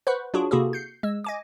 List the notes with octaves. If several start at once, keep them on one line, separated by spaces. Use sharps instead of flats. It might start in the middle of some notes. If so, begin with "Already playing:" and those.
B4 C5 F#5 B5 C#6
F#3 D4 F4 F#4 G#4
C3 A#3 E4 F#4 G#4 A4
G6 C7 C#7
G#3 E6
D#5 G#5 D6